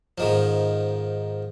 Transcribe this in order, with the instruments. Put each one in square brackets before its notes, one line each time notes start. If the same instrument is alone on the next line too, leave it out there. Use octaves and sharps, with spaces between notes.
[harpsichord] G#2 D#3 F3